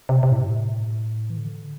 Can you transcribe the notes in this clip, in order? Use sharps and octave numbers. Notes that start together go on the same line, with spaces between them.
C3
C3
A2
G2
A2
E3
D3